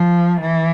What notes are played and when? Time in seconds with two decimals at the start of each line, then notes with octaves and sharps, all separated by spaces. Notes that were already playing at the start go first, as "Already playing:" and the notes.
Already playing: F3
0.41 E3